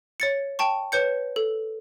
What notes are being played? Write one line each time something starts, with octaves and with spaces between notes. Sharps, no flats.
C#5 A6 C#7
G5 A5 C#6
B4 C#5 G6 C#7
A4